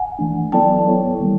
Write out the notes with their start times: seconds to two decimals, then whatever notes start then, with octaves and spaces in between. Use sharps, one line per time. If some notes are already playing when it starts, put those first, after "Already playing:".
Already playing: F#5 G#5
0.19 E3 A3 D4
0.52 F#3 B3 E4 A4 D5 G5 A5
0.86 B3 E4 A4 C#5
1.19 D#3 G3 A#3